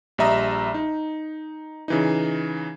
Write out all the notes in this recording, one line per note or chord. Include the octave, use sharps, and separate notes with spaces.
A#1 G3 D#5 E5 A#5 D#6
D#4
C#3 E3 D#4